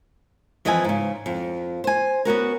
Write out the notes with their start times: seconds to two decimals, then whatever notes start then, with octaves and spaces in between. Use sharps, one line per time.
0.65 F2 E3 F3 D#5 E5 G#5
0.84 G#2 C#3
1.26 F2
1.84 C5 G#5
2.25 B3 C#4 F#4 A#4